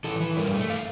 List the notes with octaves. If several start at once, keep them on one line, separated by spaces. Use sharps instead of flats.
E3 A4
E3
G2 A#4
A3
F5